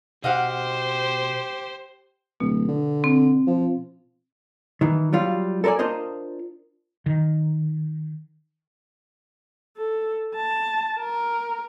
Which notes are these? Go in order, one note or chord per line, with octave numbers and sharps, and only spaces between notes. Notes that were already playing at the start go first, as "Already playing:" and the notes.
B2 G4 C5 D#5 F5 F#5
D1 B2
D3
C4
F3
D#3 E3
F#3 G3 F4
A4 A#4 C5 D5 G#5
D4 F4 A#4 C5 D#5
D#3
A4
A5
A#4